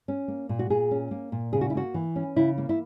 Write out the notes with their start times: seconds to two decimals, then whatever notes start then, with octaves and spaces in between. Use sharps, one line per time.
0.08 C#4
0.28 A#3
0.49 A#2
0.59 F#4
0.70 A#2 G#4
0.91 C#4
1.11 A#3
1.32 A#2
1.53 C#3 G#4
1.61 F#4
1.70 E4
1.75 A#3 F#4
1.94 E3
2.16 C#4
2.36 C#3 E4
2.58 A#3
2.69 E4